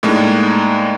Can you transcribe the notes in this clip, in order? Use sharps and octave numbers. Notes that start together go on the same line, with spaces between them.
A2 G#3 A#3 D4 D#4